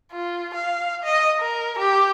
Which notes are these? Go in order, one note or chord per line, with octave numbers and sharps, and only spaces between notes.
F4
F5
D#5
A#4
G4